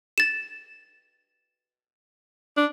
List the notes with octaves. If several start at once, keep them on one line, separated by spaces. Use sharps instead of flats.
A6 E7
D4